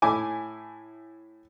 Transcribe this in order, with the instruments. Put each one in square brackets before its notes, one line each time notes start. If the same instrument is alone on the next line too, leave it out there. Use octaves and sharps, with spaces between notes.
[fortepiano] A2 E4 G#5 D6